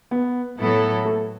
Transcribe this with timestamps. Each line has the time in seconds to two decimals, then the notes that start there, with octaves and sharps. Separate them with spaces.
0.11 B3
0.58 A2 F#3 B3 E4 A4
1.05 A3